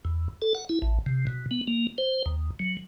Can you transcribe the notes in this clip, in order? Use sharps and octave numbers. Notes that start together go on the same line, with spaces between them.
E2
A4
F#5
E4
A1
C3
B2
B3
A#3
C5
D#2
F#3